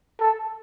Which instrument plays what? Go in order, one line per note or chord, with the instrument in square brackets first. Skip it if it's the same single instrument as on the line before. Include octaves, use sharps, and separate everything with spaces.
[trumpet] A4